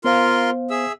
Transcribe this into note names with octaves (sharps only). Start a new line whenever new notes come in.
B3 F4 A#4 C5 F5 C6
G#4 E5 E6